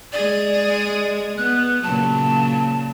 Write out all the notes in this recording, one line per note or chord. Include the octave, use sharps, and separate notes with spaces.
G#3 G#4 D5
B3 F#6
A#2 C#3 F#3 A5